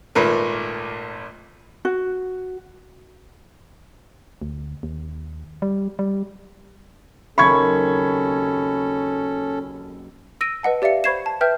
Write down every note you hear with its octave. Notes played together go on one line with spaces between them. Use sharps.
G#1 A#2 A3 A#4 B4
F#4
D2
D#2
G3
G3
F#1 D#2 C4 C#4 A4 B5 C#6 G#6
E6 A#6 D7 D#7
B4 D#5 F#5 A5
G4 D5 E5 F5 C#7
C5 B5 C#6 G#6 C7 E7
A5
B4 E5 G5 F6 G6